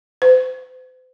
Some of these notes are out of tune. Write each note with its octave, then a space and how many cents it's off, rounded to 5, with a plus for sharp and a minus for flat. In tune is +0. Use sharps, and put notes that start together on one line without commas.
C5 -40